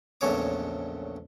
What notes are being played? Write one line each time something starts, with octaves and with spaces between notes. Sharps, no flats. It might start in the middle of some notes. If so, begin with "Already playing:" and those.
A#1 E2 A2 C#3 C#5 D6